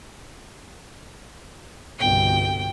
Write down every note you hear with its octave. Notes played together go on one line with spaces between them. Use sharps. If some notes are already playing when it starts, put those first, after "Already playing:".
G1 C2 B2 G5